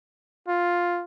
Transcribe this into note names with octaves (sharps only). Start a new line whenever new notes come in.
F4